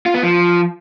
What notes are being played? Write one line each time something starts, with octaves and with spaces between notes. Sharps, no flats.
F4
B3
F3